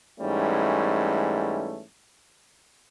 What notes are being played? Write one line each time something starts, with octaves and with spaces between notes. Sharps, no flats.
G#2 E3 G3 A3 C#4